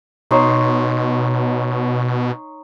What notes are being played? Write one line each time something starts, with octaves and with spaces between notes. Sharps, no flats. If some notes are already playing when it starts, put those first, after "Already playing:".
B2 D#4 C#5 C6